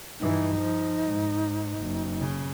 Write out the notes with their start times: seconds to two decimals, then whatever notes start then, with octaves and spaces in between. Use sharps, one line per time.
0.20 G2 E3 D#4
0.56 F3
1.06 G#2
1.80 F#1
2.20 C#3